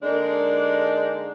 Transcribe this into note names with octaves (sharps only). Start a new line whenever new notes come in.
D3 G#3 A#3 D4 D#4